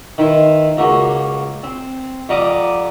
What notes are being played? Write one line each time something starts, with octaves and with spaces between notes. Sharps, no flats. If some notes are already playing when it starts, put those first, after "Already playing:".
D#3 E4 B4 C6
C#2 A#3 F#4
C4
F2 G3 F#5 A#5 D6 D#6